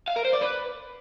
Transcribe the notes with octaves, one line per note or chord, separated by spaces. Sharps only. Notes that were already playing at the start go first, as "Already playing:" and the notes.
F5
A#4
C5
D5
B4